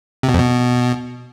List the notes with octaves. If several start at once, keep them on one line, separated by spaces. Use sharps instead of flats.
C3
B2
F2
B2